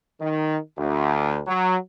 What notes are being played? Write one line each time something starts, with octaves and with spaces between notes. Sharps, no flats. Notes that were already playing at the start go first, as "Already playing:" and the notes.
D#3
D2
F#3